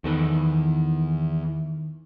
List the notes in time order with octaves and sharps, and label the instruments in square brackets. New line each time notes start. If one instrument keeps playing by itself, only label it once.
[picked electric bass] E2 [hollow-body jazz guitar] D#3 A4 B4